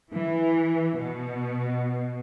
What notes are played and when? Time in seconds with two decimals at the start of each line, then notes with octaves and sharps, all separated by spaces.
0.12 E3
0.97 B2